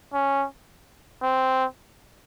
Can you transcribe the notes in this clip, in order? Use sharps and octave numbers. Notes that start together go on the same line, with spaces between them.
C#4
C4